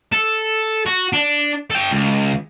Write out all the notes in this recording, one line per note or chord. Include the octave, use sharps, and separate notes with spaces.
A4
F#4
D4
A4 G5
C#2